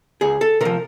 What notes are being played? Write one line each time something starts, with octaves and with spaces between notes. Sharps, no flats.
C#2 G#4
A4
C3 F3 A#4